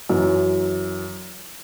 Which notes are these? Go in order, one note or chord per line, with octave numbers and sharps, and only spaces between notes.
F#2 E3 F#3